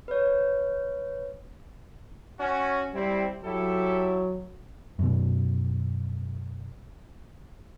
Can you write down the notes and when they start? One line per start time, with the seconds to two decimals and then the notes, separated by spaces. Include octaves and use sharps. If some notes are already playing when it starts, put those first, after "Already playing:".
0.08 B4 C#5
2.39 C#4 F#4
2.94 G3 C4 E4
3.44 F#3 E4 G4 A4
4.99 F#2 B2